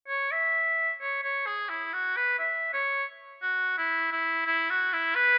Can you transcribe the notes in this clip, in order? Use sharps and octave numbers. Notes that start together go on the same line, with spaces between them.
C#5
E5
C#5
C#5
G#4
E4
F#4
B4
E5
C#5
F#4
E4
E4
E4
F#4
E4
B4